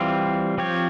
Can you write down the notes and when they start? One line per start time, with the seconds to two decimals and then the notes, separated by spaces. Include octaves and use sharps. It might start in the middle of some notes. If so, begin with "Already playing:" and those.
Already playing: E3 G3 C4 F4
0.58 F3 C4 G4 C#5